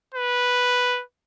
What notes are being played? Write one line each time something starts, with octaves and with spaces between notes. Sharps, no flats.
B4